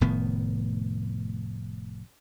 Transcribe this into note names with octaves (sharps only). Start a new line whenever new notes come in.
F1 A2 D#3 B3